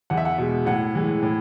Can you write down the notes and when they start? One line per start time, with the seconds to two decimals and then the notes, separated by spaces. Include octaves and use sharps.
0.10 E2 F#5
0.18 E5
0.25 F#5
0.38 B2 G#3
0.66 A2 F#5
0.95 E3 G#3
1.23 A2